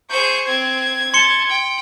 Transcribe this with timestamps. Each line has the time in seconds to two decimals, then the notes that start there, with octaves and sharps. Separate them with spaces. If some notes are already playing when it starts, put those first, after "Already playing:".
0.10 G#4 C5 C#6 G6
0.48 C4 G#6
1.14 A5 C6 C#7 G7
1.49 G5